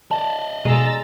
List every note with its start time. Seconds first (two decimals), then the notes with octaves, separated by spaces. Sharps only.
0.11 D5 D#5 A5
0.65 B2 G#3 A#5 E6 A6